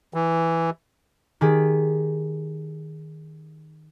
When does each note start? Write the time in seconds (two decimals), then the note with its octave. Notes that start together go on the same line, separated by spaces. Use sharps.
0.14 E3
1.41 D#3 G4 G#4 B6